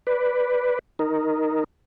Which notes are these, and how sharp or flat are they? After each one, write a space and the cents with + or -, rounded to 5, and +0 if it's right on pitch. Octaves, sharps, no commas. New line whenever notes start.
B4 +0 D5 +0
D#4 +0 A#4 +0